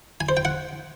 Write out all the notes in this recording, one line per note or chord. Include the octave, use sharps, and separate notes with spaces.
G#5
C5
G5
F#5